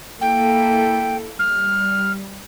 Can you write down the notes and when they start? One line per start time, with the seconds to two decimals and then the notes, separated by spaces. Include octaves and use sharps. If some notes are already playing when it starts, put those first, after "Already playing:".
0.21 A#3 E4 A4 G5
1.39 G3 F6